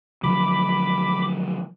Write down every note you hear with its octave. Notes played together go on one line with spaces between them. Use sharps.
D3 F3 F#3 B5 D6